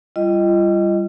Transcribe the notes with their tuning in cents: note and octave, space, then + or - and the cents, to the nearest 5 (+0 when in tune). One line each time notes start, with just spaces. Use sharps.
G3 +0 F4 -35 D#5 +0